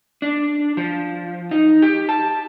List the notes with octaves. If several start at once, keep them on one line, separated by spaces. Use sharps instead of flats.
D4
F3
D#4
G4
A5